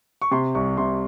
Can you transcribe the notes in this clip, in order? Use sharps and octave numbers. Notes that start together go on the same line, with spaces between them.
C#6
C3 C6
C2 C#6
C3 C6